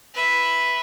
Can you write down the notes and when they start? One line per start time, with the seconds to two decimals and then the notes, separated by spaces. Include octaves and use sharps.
0.14 B4 E5